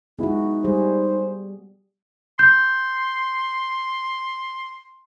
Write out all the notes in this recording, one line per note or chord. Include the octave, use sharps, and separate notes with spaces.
G#3 B3 D#4 E4 F#4
G3 G#4 C5
C6 G6